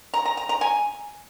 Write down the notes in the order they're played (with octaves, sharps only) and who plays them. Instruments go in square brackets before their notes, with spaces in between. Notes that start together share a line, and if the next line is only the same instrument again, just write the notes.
[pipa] A#5
A#5
A#5
A#5
G#5